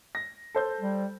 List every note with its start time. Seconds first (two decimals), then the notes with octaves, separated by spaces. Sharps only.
0.15 A#6
0.55 A4 C5 G6
0.80 G3